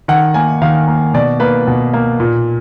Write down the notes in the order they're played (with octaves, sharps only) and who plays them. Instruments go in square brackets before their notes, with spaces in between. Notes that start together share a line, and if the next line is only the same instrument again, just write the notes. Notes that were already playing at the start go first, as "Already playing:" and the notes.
[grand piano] D#3 F#5
A#3 G#5
D#3 F5
A#3
B2 D5
A#3 B4
B2
A#3
A#2